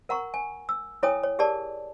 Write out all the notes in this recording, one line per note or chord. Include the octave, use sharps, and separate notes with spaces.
A#4 F#5 A#5 C#6
G#5
E6
E4 A4 C#5 G5 G#5 D#6
C#5
G4 G#4 A#4 D5 A5